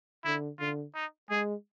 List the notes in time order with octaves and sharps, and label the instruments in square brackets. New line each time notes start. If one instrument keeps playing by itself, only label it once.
[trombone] D3 [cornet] E4
[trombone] D3 [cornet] F4
[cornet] D#4
[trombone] G#3 [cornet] G#4